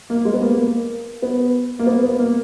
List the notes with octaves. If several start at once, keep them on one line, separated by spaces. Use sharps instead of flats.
A#3
G#3
B3
A#3
A#3
B3
A#3
B3
B3
A#3